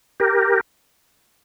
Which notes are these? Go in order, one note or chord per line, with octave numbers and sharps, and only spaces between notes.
G4 A#4